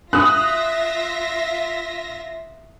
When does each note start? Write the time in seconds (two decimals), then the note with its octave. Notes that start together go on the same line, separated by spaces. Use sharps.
0.13 F4 E5 D#6 F#6 A#6